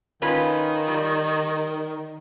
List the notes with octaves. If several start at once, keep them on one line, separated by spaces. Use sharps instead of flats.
D#3 C#4 F4 B4
G3